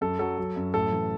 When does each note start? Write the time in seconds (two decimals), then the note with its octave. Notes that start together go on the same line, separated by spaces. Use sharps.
0.01 F#2 A4
0.19 F#3 A4
0.38 F#3
0.56 F#2
0.74 A2 A4
0.92 E3